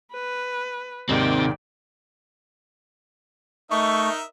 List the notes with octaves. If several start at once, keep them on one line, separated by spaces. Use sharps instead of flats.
B4
D#2 G#2 C3 D#3 C4 D5 G5
A3 D#4 A#4 D#5 E5 C#6